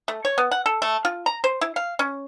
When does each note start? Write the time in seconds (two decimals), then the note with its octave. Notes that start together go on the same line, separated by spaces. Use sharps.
0.08 A3
0.25 C#5
0.38 B3
0.51 F#5
0.66 A4
0.82 A3
1.05 F4
1.26 A#5
1.44 C5
1.61 E4
1.76 F5
1.99 C#4